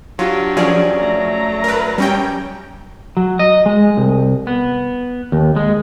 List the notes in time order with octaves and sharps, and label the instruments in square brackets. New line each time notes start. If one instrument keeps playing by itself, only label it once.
[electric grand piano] F#3 [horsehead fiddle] D4 G4 [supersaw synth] F4
[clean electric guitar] F#2 D5 [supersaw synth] F3 C#4 G#4
[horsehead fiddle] A3 A#5
[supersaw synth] A#4 B4
G3 C#4 G5
[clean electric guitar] F#3
D#5
G#3
C2
B3
D#2
G#3